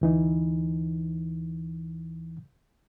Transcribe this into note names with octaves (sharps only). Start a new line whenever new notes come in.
D2 E3 D#4